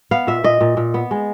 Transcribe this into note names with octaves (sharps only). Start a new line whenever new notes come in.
B3 F5
A#2 E5
A#2 D#5
A#2
A#2
B3
G#3